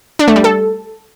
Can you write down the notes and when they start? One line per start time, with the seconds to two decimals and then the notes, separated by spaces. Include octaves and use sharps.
0.19 D4
0.28 A3
0.36 G3
0.44 A4